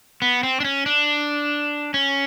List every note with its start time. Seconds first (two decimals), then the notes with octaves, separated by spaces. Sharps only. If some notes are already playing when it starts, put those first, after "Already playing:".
0.22 B3
0.43 C4
0.60 D4
0.64 C#4
0.86 D4
1.94 C#4